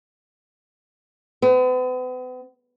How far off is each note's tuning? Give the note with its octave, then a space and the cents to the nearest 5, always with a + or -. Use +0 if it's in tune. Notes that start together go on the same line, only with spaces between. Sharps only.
B3 +40